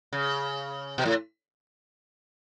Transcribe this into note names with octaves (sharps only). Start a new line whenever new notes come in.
C#3
B2
A2